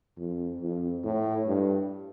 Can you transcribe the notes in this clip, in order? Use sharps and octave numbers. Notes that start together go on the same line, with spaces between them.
F2
F2
A2
G2